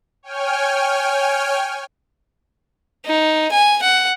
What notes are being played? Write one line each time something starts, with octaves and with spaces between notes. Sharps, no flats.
C#5 G5 G#5 F6
D#4
G#5
F#5